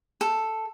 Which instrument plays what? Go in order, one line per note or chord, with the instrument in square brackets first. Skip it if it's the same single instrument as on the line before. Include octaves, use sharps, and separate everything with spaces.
[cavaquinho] A4